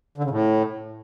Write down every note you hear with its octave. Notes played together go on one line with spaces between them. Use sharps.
D3
C#3
A2